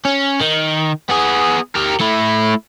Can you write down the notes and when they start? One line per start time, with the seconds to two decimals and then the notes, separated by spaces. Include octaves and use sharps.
0.05 C#4
0.40 D#3
1.09 B3 G#4
1.75 G4 A#4
2.00 A3 E4